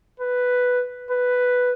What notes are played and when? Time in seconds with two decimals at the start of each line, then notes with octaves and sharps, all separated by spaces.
0.20 B4
1.11 B4